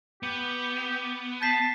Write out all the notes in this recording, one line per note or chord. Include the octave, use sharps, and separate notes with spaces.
B3 G4
A5 G6 B6 C7